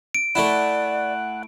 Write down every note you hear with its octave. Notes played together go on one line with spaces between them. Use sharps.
D7
A3 E4 D5 F#5